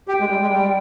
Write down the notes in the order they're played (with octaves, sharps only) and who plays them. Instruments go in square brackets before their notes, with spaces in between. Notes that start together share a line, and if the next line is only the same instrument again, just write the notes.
[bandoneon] G4 [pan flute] G5
[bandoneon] G#3
G3
G#3
G3